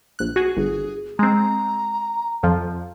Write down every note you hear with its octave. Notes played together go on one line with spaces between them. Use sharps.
A#1 F#6
F#4 G#4
G1 G#4
G#3 C4 A#5
F2 F3